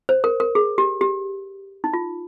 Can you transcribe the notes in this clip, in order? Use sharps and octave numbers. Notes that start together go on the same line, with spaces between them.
C5
A#4
A#4
G#4
G4
G4
D#4
F4